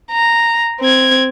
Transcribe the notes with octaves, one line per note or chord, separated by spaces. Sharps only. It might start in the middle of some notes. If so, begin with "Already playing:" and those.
A#5
C4 G#6